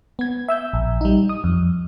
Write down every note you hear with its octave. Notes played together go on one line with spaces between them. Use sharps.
B3 G#6
E5 E6 G6
A#1
G3 D#4
D#6
F2